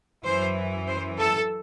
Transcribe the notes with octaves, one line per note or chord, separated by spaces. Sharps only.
F#2 E3 C5
C5
A4